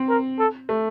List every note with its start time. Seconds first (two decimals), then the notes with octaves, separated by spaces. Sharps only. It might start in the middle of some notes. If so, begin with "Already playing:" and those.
Already playing: C4
0.09 A#4
0.39 A4
0.69 A3